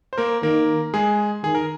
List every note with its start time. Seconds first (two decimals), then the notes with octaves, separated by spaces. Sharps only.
0.13 C5
0.18 A#3 A#4
0.43 D#3 A#3 A#4
0.94 G#3 G#4
1.44 D#3 G#4
1.55 A#4